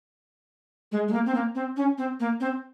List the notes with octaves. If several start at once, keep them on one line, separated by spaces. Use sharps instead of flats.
G#3
G#3
A#3
C4
A#3
C4
C#4
C4
A#3
C4